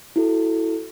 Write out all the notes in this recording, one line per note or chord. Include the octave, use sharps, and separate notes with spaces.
E4 F#4 A4